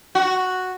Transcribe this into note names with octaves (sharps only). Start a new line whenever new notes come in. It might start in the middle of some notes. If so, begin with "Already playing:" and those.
F#4